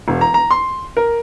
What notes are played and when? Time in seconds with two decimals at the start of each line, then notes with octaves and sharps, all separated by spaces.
0.08 E1
0.21 A#5
0.34 A#5
0.51 C6
0.97 A#4